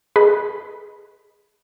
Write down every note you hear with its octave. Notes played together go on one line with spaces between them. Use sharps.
G#4 A4 B4 D#5 B5